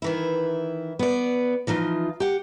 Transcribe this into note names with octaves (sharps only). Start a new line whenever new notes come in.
D#3 E3 E4
B3 D5
E3 F3 D#4 F4
G4 F#5